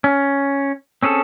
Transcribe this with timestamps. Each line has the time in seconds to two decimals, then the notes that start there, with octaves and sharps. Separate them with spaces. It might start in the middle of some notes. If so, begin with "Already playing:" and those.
0.04 C#4
1.03 C4 C#4 G#4 A4